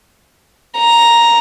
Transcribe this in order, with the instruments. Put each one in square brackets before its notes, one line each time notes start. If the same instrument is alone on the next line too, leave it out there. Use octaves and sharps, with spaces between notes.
[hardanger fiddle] A#5